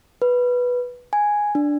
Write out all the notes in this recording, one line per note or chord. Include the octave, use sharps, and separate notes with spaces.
B4
G#5
D4